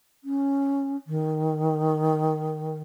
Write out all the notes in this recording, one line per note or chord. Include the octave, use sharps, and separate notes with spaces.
C#4
D#3